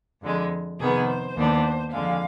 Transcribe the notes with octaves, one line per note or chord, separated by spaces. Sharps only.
F2 D3 G#3
F2 C3 D#3 B3 G#4
C5
D#2 D#3 B3 D4
F2 D3 G#3 F5